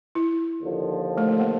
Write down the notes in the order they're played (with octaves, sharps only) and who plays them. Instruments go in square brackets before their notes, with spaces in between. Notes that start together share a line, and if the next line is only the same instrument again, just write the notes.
[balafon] E4
[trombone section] D#2 D3 F3
[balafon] A3
A3
A#3